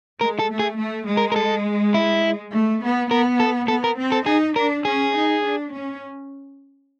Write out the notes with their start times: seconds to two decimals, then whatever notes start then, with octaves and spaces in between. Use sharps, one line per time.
0.20 G#3 A#4
0.39 A4
0.50 A3
0.59 G#4
0.78 A3
1.07 G#3
1.17 A#4
1.32 A#4
1.36 A4
1.94 E4
2.53 A3
2.82 B3
3.11 B3 A#4
3.40 A4
3.68 B3 A4
3.84 A#4
3.98 C4
4.12 A4
4.26 D#4 G#4
4.56 D4 A#4
4.85 C#4 G#4
5.14 D#4
5.43 D4
5.72 C#4